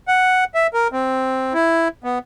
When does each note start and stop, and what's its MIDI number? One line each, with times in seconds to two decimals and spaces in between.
0.08 0.44 78
0.54 0.67 76
0.74 0.88 70
0.92 1.53 60
1.54 1.88 64
2.04 2.18 59